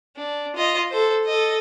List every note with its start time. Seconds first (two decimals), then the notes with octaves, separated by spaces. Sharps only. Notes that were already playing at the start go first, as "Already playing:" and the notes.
0.17 D4
0.56 F4 D#5
0.91 A4 C5
1.25 A4 D#5